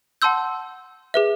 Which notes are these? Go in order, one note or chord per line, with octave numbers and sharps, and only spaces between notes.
F#5 A5 C6 E6 G6
G#4 B4 E5